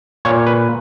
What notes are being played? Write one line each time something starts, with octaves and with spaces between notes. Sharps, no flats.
A#2 C#5
B4